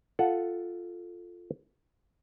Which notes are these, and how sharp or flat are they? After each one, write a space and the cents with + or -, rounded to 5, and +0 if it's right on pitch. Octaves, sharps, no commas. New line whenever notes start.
F4 +0 A4 +0 F#5 +0